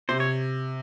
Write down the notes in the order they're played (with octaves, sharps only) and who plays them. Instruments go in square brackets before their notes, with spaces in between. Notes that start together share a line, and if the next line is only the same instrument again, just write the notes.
[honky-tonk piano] C3 [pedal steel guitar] C5
[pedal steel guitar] C#5